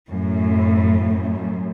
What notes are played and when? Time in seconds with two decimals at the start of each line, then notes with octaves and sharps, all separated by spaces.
0.10 F#2 A2
1.02 F#2